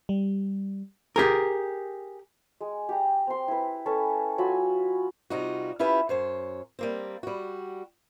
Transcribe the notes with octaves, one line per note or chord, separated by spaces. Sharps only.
G3
G4 G#4 A#4
G#3
G4 A#5
C4 C6
E4 B4
C#4 A4 B4 C#6
F#3 F4 G#5 B5
C3 G3 D#4 F4 F#4
C#4 E4 F4 G4 B4
F#2 C5 C#5
G3 A#3 C4
G3 F#4